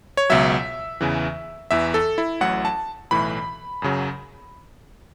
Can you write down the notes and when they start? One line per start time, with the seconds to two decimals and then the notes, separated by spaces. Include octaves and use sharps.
0.17 C#5
0.30 C#2 B2 F#3 E5
1.01 E2 C#3 E3
1.71 E2 E3 E5
1.94 A4
2.18 E4
2.41 A1 A2 F#3 F#5
2.65 A5
3.11 B1 A2 E3 B5
3.82 F#2 C#3 F#3